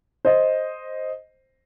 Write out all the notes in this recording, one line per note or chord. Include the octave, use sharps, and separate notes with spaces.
C5 D#5